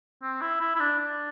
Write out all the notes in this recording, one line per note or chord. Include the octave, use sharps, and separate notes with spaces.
C4
E4
E4
E4
D4
D4